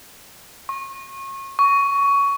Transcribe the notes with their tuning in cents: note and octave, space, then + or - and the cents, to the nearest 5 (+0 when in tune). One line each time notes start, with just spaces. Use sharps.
C#6 -35
C#6 +15